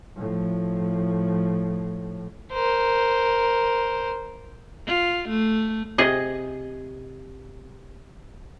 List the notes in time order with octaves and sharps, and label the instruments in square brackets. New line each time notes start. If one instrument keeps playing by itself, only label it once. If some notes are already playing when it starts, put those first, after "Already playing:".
[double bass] A2 F3
[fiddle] A#4 C5
[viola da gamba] F4
A3
[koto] C3 G#4 D#5